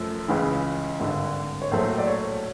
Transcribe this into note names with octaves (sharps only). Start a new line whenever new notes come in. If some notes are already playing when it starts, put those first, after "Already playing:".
Already playing: F#2 F3 A3
C#2 C#3 E3
G#1 G2 D3
C#5
A#1 A2 F#3 A3 C5
D5
C#5